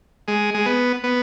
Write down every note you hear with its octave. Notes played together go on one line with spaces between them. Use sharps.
G#3
G#3
B3
B3